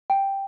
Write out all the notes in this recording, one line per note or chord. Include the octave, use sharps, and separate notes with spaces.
G5